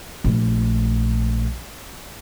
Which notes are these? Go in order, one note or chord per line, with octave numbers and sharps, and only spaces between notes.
A#1 A3